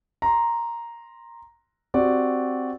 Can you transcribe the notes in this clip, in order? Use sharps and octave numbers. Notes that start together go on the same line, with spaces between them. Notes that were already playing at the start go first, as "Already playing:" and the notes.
A#5 C6
C4 F#4 G4 D5